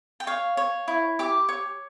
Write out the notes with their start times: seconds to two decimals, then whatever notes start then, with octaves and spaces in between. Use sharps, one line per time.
0.20 G5
0.27 C#5 F5
0.57 C#5
0.88 E4
1.19 G4 D6
1.49 C#5